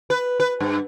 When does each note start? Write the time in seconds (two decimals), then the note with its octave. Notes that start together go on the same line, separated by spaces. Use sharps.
0.10 B4
0.40 B4
0.60 G2